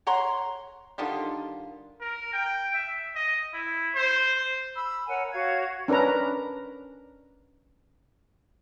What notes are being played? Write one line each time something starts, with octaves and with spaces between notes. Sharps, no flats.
C#5 F#5 A#5 C6
D3 D#3 G3 F4
A#4
G5
E5
D#5
E4
C5
B5 E6
A#4 C#5 F#5 G#5
F#4 C#5 F5 G#6
C#4 D4 A#4 B4 A#5